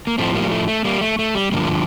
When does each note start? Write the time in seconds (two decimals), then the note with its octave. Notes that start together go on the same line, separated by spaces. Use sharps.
0.07 A#3
0.18 A2 F3 A3 C4
0.35 G3 A#3
0.51 A3
0.68 A3
0.85 G3 A#3
1.01 A3
1.19 A3
1.35 G3
1.52 G2 D3 F3 G3 A#3